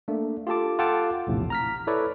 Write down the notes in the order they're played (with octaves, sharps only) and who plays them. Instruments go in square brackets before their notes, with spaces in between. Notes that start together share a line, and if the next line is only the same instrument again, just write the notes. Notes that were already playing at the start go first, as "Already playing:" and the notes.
[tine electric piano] A3 A#3 D4
F4 G4 A4 A5 D6
F4 A4 F#5 G5 A5 D6
A#1 E2 A2 C3
A#5 F6 B6
E4 A4 B4 C#5 D5